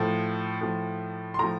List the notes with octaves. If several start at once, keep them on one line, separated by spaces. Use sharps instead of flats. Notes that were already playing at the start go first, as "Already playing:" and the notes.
Already playing: A2 F3
A2 F3
C6
A2 F3 A#5